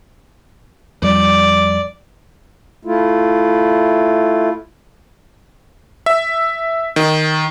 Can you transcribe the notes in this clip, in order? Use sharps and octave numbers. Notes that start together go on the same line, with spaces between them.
F2 G3 D5
A3 E4 F4
E5
D#3